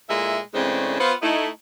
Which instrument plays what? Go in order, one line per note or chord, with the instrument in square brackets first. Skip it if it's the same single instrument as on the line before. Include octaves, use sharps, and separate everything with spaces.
[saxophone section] A#2 G#3 A3 E4 E5
A2 C#3 E3 G#3 C4 D4
B3 F4 C5
A3 D#4 E4